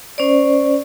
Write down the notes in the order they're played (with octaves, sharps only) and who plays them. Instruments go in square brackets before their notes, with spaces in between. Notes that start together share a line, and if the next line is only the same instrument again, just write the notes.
[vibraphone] C#4 C5 D5